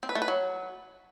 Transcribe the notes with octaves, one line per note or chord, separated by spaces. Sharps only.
C4
B4
A3
B4
F#3